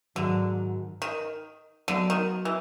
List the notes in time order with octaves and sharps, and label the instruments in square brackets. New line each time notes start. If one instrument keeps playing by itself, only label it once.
[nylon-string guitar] G#2 D#3 F#3 [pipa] D3
[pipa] D#3
[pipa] D3 [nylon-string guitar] F#3 B3 D#4
[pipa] D#3
E3